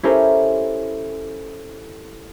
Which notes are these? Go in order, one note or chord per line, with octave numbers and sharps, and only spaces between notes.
C#4 E4 G4 A4 A#4 C5